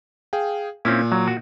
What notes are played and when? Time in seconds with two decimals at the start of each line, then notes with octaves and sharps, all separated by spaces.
0.33 G#4 F5 G5
0.85 A#2 C4 C#4 E4
1.12 F#3
1.28 F#4